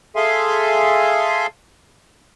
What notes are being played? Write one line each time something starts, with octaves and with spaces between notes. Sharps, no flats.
G#4 A4 E5 F5 G#5 C6